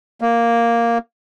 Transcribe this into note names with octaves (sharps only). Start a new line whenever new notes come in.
A#3